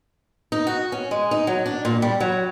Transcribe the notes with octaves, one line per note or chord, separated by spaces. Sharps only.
D#4
F#4
C#4
G#3
D#4
F#3
D4
A#2
G3
F#3